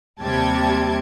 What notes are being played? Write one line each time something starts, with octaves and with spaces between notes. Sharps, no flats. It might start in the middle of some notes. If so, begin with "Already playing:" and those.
D#2 C3 G3 G5 A5 G#6